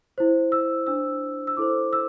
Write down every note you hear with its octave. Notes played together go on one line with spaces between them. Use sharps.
E4 C5
E6
D4 C5 E6
E6
E4 A4 C5 D6
E6